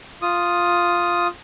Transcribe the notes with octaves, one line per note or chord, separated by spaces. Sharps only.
F4 D#6